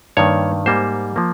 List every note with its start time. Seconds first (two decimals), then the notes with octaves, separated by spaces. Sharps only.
0.17 G2 D#3 A#3 C#5
0.66 G#2 G3 A#3 C5
1.16 F3 A#3